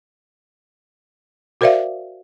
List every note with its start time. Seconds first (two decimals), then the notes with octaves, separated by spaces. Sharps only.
1.61 F#4 A#4 C5 D5 E5 F5